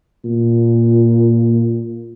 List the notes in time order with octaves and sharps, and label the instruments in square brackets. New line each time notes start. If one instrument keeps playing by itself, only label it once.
[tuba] A#2